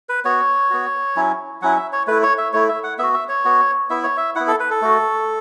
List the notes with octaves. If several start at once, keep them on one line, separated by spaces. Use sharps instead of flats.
B4
B3 F#4 C#5
B3 F#4
F#3 C#4 E4
F#3 C#4 E4 F#5
E5
C#5
A3 E4 B4
C#5
E5
A3 E4 C#5
E5
F#5
B3 F#4 E5
E5
C#5
B3 F#4
B3 E4 E5
C#5
E5
B3 E4 F#5
A4
B4
A4
A3 F#4